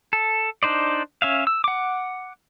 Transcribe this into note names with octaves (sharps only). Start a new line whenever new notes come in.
A4
D4 D#4 C5 D5
C#4 E5 F5
E6
F#5 D6